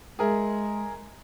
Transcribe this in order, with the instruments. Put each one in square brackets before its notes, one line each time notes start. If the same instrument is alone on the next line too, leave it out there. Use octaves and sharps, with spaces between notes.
[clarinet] G#3 [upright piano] G#4 A#4 E5